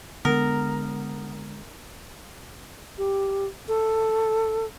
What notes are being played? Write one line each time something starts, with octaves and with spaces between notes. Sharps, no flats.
D3 G#3 B3 A#4
G4
A4